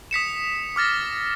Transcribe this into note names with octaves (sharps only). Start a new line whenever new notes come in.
D#6 B6 C#7 E7
D6 F6 A6 A#6